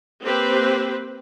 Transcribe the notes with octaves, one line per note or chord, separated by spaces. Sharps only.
A#3 C4 G4 B4 C5